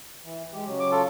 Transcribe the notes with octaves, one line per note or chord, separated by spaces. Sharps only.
E3
G#3 G4
C#3 F#3
D6
F4 A4